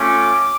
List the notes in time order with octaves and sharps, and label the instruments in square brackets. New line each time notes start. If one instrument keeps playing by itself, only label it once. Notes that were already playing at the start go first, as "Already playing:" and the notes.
Already playing: [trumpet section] A3 C#4 F4 D6